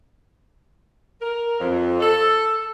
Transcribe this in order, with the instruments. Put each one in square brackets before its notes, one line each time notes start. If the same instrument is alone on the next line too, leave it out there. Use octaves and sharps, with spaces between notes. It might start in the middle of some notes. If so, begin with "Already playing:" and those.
[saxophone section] A#4
F2
A4